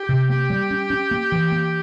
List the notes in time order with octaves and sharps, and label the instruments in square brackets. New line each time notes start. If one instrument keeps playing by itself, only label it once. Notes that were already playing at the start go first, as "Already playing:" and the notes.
Already playing: [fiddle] G4
[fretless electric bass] C3
[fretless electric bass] A#3 [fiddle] G4
[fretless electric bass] G3
C#4
C#4
A#3
E3
A#3